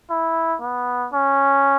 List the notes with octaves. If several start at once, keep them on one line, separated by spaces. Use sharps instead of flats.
E4
B3
C#4